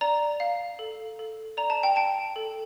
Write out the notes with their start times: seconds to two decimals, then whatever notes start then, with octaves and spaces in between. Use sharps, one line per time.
0.01 D5 A#5
0.40 F5
0.79 A4
1.19 A4
1.57 D5 A#5
1.70 A5
1.83 G5
1.96 G5 A5
2.36 A4